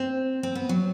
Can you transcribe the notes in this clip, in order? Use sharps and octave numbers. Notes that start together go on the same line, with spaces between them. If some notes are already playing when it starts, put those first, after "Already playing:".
Already playing: C4
C4
B3
F#3